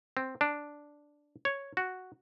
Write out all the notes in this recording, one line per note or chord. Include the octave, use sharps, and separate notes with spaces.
C4
D4
C#5
F#4